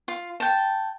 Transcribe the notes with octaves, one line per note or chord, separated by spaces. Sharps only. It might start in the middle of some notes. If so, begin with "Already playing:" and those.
F4
G5 A5